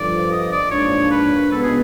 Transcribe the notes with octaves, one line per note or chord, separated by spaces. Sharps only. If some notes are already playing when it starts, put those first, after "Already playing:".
Already playing: G2 D3 F3 D5
D#5
D5
G#2 F3 A#3 D4 C#5
B4
C#2 B2 G#3 B3 A4
G#4